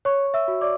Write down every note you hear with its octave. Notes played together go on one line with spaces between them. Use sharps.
C#5 C#6
C#5
E5 E6
F#4
D5 D6